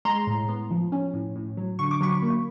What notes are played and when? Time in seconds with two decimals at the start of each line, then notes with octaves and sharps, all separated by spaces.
0.05 G#3 A#5 C6
0.27 A2
0.48 B3
0.71 F3
0.92 C#4
1.14 A2
1.36 A2
1.57 F#3
1.79 D3 C#6
1.91 D6
2.01 F#3 B5 C#6
2.22 A#3